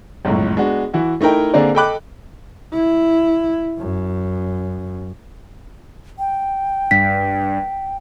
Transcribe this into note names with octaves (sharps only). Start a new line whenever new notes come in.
G1 C#2 F#2 A2
G#3 B3 D4 F#4
E3 E4 F#4
A3 D#4 E4 A#4 G5
D3 A#3 C4 G#4 A#4 D5
A4 D#5 G5 B5 D6 F#6
E4
F#2
G5
G2 B6